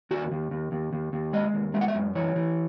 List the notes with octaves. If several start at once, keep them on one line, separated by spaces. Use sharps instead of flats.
D#2 F#4
D#2
D#2
D#2
D#2
D#2
G#3 D#5
D#2
G#3 E5
F#5
E5
F#2
E3 C#5
E3